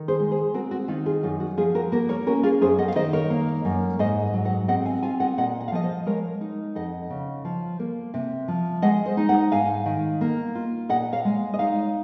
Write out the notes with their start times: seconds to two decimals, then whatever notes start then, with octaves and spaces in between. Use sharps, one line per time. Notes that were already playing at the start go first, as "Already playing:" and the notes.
Already playing: D#3
0.08 G#4 C5
0.20 G#3
0.31 G#4 C5
0.54 C4 F#4 A#4
0.71 F#4
0.88 D#3 F4
1.06 F4 G#4
1.23 F#2 F4
1.40 F#4
1.57 F3 F4 G#4
1.75 F#4 A#4
1.92 A#3 F#4 A#4
2.09 A#4 C#5
2.27 C#4 F#4 A#4
2.43 F4 G#4
2.61 F#2 G#4 C5
2.78 D#5 F#5
2.88 F5
2.96 D#3 C5 D#5
3.13 A#4 C#5
3.30 A#3
3.65 F#2
3.99 G#2 C5 D#5
4.34 F#3
4.45 D#5 F#5
4.68 C4 D#5 F#5
4.85 F5 G#5
5.03 F4 F5 G#5
5.20 D#5 F#5
5.38 A#2 D#5 F#5
5.60 F#5
5.68 F5
5.72 F3 D#5 F#5
5.83 C5 D#5
6.06 G#3 A#4 C#5
6.41 D#4
6.75 F2 D#5 F#5
7.10 C#3
7.45 F3
7.79 A#3
8.14 C3
8.48 F3
8.82 G#3 D#5 F#5
9.05 C5 D#5
9.17 D#4
9.29 D#5 F#5
9.52 G#2 F5 G#5
9.86 D#3
10.21 A#3
10.55 F4
10.89 A#2 D#5 F#5
11.12 C#5 F5
11.25 G#3
11.54 D#5
11.59 D#4 C#5 F5